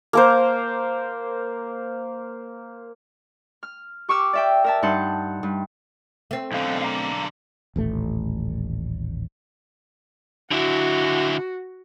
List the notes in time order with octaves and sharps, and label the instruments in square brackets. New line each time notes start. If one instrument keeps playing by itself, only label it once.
[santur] A#3 A#4 C5
[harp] F6
G4 C#6 D6 E6 F6
D5 E5 G5
A#4 E5 A5
G2 D#4 F#5 A5 C6 G6
G2
[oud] A3 C4
[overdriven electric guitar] B1 D3 [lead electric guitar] E2 F5
[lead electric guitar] F5 A#5
[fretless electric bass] D#1 A1 A3
[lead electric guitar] D3 E4 [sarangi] F#4